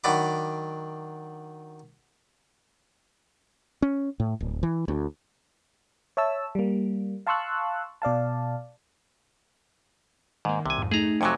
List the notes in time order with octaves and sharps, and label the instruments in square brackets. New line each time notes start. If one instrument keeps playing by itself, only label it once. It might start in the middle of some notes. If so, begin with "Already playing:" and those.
[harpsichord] D#3 F#3 D4 F#5 B5 D6
[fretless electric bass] C#4
A2
D1
E3
D2
[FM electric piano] C#5 E5 A5 E6
G3 A#3
F5 A5 C6 C#6 E6 F#6
B2 D5 F5 A5
[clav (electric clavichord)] G#2 [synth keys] D#3 A#3
[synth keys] C2 [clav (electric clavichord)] C3 G#5
[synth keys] F2 G#2
[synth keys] A3 D#4 [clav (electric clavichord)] G#4 A#5
[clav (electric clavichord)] F2 C3 F#3 [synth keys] G#5 C#6 G#6